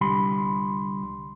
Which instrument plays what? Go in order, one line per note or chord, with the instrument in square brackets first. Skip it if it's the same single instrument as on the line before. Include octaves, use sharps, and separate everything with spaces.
[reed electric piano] C2 D3 G3 B5 C6